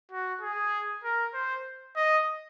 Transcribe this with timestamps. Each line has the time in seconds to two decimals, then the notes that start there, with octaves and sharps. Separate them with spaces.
0.12 F#4
0.41 G#4
1.04 A#4
1.34 C5
1.96 D#5